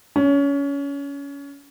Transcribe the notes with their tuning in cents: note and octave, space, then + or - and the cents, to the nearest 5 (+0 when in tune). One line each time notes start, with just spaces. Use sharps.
C#4 +25